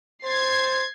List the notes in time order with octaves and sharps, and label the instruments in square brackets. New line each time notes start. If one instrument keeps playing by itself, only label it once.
[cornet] C5 [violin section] G#6 A6 C7